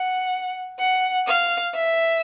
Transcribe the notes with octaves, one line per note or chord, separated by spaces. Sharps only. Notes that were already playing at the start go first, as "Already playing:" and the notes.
Already playing: F#5
F#5
F5
E5